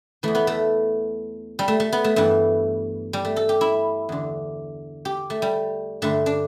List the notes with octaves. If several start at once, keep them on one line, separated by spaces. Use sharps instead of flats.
E2 E3 A3
B3
A3
G3
A3
A3
B3
A3
G2 E3 A3
G3
A3
A4
G4
E4
E2 D3
G4
A3
G3
G2 D3 A3
D4